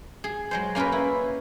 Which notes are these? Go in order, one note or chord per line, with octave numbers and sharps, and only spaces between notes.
G#4
F#3 G#3 C5
A#3 C#4 F4 A#4 B4
E4